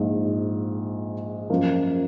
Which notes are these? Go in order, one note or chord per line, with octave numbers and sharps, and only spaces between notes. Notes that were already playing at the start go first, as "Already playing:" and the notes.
Already playing: A#1 G#2 F3
F#2 F3 A#3 F4